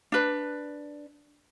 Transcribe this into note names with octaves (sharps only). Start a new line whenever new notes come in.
D4 B4